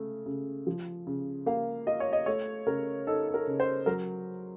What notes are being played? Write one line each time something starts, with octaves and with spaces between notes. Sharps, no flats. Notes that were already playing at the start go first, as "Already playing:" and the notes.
Already playing: C#3 A3
C#3
F3
C#3
A#3 F5
F4 D#5
C#5
D#5
A3 C#5
C#3 A#4
D#4 A4
A4
A#4
C#3
C5
F#3 A#4